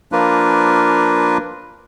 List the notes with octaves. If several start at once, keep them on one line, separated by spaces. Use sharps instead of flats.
F3 A#3 D4 F4 A#4 B4